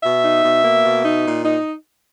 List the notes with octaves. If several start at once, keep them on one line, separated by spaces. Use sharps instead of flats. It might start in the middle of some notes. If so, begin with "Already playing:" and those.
B2 E5
D#4
B2
A#3
B2
D#4
A#2
D#4